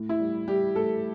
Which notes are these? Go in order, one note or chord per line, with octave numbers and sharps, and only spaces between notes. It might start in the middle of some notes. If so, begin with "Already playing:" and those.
Already playing: A2
E4
G3
G3 G4
A2 A4